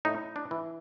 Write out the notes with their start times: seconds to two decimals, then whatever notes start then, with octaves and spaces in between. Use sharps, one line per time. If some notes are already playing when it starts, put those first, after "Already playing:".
0.05 A2 D#4
0.36 D4
0.51 E3